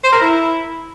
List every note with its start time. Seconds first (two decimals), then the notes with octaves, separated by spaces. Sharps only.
0.04 C5
0.13 A#4
0.22 E4